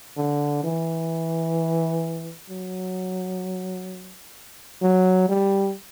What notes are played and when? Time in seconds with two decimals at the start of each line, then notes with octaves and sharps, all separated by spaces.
0.17 D3
0.64 E3
2.50 F#3
4.82 F#3
5.29 G3